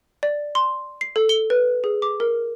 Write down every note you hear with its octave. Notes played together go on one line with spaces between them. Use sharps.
D5
C6
C7
A4
G7
B4
G#4
D6
A#4